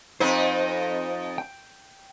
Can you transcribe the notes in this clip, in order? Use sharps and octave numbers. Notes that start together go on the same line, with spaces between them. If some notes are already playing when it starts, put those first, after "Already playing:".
F2 D#4 C5
G5